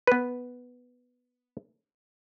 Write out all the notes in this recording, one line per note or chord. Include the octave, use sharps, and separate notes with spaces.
B3 B4